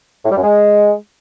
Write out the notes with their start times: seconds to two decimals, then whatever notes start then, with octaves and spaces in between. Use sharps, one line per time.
0.25 A2
0.31 G3
0.37 F#2
0.43 G#3